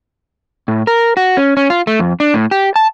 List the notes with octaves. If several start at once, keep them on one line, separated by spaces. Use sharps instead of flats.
A2
A#4
F#4
C#4
C#4
F4
A3
F2
D4
A2
G4
A5